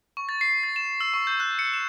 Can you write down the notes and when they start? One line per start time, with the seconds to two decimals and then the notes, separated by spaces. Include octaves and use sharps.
0.17 C#6
0.29 A6
0.41 C7
0.63 A6
0.76 E7
1.01 E6
1.14 C#6
1.27 G6
1.40 F#6
1.59 C#7
1.73 E7